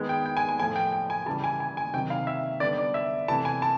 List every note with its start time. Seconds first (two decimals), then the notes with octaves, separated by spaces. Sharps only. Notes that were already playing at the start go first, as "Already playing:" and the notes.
Already playing: D#3 G#3 B3
0.09 G5
0.26 G5
0.37 G#5
0.48 G#5
0.59 A2 F3 A3 G#5
0.76 G5
0.92 G5
1.10 G#5
1.26 C#3 E3 G3 A5
1.44 G#5
1.60 G#5
1.77 G#5
1.94 C3 D#3 F#3 G5
2.10 F5
2.27 E5
2.60 D3 G3 B3 D5
2.78 D5
2.94 E5
3.28 C3 E3 A3 A5
3.45 G#5
3.62 A5